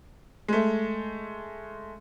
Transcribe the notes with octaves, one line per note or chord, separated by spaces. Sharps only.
G#3 A3